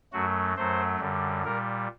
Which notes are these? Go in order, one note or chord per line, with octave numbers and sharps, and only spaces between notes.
F#2 F#3 A3 F#4
F#2 F#3 A3 C5
F#2 D3 G3
A#2 G3 A#4